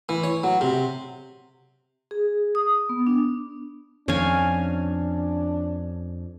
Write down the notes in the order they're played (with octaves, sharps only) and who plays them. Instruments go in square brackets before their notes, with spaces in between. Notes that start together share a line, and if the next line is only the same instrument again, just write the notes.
[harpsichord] E3
C#5
F#3
C3
[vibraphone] G#4
D#6
B3
D4
[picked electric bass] F2 [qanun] C#4 F5 G#5 [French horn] D4